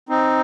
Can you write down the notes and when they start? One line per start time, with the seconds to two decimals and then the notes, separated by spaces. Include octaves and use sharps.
0.09 C4 D#4